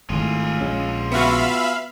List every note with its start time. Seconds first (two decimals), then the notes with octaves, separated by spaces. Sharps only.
0.10 G#1 A2 F4 G#4
0.61 A#1 G#3 C#4
1.12 B3 F#4 E5 F5 B5